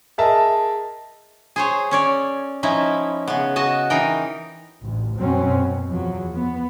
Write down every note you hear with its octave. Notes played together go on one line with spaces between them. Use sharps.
G#4 A#4 D#5 E5 A5
G#4 C5 C#5
C#4 C#5 D5
F3 C#4 D#4 E4
C#3 B3
F#4 D#5 A5
E3 D#4 A#4 G5
A1 D2
F#2 B2 F#3 C4 C#4
B2
E2 F3 F#3
B3